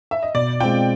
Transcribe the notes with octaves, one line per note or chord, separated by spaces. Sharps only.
E5
D#5
B2 D5
G#3 C4 F4 G5